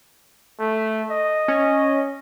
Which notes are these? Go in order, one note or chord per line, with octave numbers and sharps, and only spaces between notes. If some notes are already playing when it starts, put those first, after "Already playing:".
A3
D#5
C#4